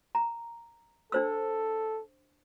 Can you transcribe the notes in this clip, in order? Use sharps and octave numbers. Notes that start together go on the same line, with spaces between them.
A#5
D4 A4 C5 E6